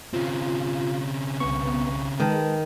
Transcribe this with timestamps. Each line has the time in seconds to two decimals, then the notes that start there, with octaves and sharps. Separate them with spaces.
0.13 C#3 C4 F4
1.40 C2 B3 C#6
2.20 D#3 G#3 A#4 B4 A5